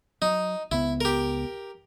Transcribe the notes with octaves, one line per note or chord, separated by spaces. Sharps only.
F#3 D#4
C#2 B3 E4
G4 A#4